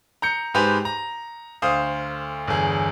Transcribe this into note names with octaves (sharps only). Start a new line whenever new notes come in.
A#5 G6 C#7
G#2 G4 B4 C5 G#5 F7
A#5
D2 C5 F5 D#6
G1 E2 G#4